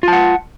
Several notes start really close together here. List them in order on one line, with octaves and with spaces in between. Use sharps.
F4 A5 F#5